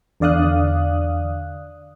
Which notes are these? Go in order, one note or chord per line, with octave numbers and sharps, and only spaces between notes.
E2 D3 D5 F5 D#6 F#6